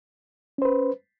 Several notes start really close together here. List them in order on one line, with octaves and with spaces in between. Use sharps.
C#4 C5 B4